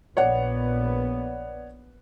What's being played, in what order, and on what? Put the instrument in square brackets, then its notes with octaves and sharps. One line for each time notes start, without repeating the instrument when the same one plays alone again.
[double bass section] A#1 B3 [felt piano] C#5 D5 F#5